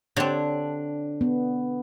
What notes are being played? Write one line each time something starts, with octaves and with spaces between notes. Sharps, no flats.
D3 C4 D4 G4 C#5
B3